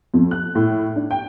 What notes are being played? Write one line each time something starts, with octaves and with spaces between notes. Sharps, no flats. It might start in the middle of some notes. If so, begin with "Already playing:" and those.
F2
F#6
A2
D4
G5